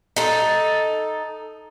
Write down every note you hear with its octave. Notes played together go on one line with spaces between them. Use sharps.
D#4 A4